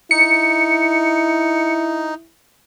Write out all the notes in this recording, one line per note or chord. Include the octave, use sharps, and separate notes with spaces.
D#4 E4 C#7